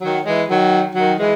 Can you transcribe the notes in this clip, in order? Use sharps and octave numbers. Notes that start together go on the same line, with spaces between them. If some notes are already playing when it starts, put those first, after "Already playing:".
D#3 F#3
E3 G#3
D#3 F#3
D#3 F#3
E3 G#3